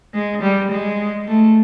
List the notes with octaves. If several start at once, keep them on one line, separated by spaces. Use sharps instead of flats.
G#3
G3
G#3
A3